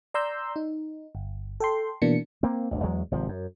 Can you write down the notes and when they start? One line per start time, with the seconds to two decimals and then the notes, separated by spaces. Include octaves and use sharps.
0.14 D5 A#5 C6 E6 G6
0.56 D#4
1.15 G1
1.60 A4 G5 C6
2.02 B2 E3 A#3 D4 C#7
2.43 A#3 C4
2.71 G1 D2
2.83 E2 F#3 G#3
3.11 G#1 C3 F3
3.29 F#2